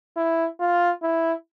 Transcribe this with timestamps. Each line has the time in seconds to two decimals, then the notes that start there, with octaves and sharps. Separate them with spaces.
0.17 E4
0.60 F4
1.03 E4